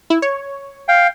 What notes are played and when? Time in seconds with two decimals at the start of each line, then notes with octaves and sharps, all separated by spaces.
0.10 E4
0.22 C#5
0.88 F5 G5